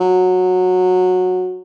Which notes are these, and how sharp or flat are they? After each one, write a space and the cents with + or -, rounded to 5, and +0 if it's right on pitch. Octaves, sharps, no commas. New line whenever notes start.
F#3 -15